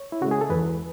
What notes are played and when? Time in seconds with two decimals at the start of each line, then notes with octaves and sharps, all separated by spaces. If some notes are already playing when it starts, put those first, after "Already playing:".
Already playing: C#5
0.12 E4
0.21 C#3 G#3 F#4
0.31 G#4
0.41 A4
0.50 E2 B4